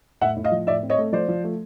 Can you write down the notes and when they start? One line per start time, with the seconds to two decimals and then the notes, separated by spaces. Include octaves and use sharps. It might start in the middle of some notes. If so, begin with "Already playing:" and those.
0.21 A2 E5 F#5
0.36 A2
0.44 D#5 F5
0.52 F3
0.67 A2 D5 E5
0.83 C4
0.90 C#5 D#5
0.98 A3
1.12 F3 C5 D5
1.28 F3
1.44 A3